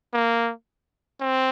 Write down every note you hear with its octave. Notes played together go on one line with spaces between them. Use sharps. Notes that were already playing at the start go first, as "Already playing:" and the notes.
A#3
C4